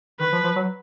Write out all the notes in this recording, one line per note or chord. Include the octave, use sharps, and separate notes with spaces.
D#3 B4
F3
F3
F#3